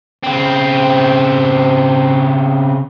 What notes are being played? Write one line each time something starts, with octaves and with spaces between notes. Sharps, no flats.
C#3 C4